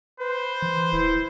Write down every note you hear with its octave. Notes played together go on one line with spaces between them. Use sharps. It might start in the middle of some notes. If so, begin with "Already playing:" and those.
B4 C5
E3
D1 E4